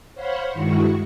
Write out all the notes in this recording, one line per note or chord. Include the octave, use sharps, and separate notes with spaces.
C5 C#5 F5 F#5 B5 C6
G2 D#3 G#3 E4 F#4 C#6